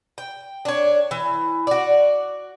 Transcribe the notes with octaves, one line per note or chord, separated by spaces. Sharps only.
G5
D4 C#5
E3
F#4 D5